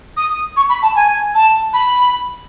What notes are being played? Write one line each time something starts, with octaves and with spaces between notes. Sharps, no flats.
D#6
C#6
B5
A5
G#5
A5
B5